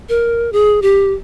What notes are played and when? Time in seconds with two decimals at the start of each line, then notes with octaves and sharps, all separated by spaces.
0.09 A#4
0.53 G#4
0.82 G4